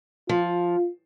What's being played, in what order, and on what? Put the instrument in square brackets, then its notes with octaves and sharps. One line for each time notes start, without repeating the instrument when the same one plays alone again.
[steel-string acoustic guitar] F3 [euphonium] F4